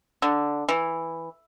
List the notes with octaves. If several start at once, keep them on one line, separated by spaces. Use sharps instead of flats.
D3
E3